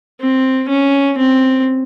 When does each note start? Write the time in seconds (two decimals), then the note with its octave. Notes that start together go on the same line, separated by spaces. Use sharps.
0.21 C4
0.69 C#4
1.18 C4